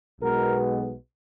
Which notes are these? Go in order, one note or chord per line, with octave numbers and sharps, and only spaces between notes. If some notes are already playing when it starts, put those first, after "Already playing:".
B1 B2 G#3 B3 A#4